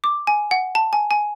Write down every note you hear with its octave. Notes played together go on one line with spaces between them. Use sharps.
D6
G#5
F#5
A5
G#5
G#5